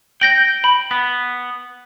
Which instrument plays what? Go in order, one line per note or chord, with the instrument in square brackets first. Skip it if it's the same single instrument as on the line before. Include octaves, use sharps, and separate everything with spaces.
[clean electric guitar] G5 [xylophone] G6 A#6 F#7
[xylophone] B5
[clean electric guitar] B3 [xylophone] B6